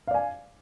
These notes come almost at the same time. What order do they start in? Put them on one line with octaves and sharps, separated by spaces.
F5 D5 G#5